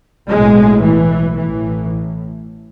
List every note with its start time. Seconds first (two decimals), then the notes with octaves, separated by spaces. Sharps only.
0.28 B1 A2 G#3
0.82 E3
1.37 A1 A2 E3